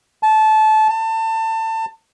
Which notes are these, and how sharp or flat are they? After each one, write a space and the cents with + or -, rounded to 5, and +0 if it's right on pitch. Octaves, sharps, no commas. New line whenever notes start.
A5 -20
A5 +25